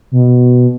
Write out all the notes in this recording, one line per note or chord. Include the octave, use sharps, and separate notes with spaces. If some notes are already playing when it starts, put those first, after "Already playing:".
B2